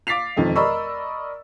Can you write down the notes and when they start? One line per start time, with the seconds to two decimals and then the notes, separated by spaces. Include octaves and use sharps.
0.07 F5 D6 A6 B6 C7 F7
0.36 E1 F2 D#3
0.56 A#4 D5 D#5 B5 C#6 E6